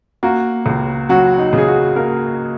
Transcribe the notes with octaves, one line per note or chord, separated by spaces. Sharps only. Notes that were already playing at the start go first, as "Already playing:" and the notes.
A#3 F#4
C#2
F#3 F#4
D#4
C#3 G#4
F#4
A#3 A#4